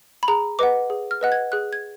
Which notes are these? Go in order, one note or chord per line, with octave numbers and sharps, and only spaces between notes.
B5
G#4 A#5
B4 D#5 F#5 D6
G#4
F6
B4 D#5 F#5 F#6
G#6
G#4 F#6
G#6